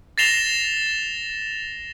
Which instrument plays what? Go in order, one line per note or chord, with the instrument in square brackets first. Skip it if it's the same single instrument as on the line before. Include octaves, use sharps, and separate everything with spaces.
[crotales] A6 A#6 C7 E7 F7 G7